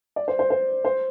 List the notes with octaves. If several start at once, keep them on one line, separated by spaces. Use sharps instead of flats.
D5
C5
C5
C5
C5